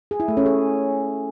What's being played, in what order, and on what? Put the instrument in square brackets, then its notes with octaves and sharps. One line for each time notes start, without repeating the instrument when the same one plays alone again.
[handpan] G#4
E4
A3
C#4
G#4